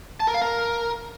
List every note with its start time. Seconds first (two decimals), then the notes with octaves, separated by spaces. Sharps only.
0.20 A5
0.27 A#4
0.34 F5
0.41 A#4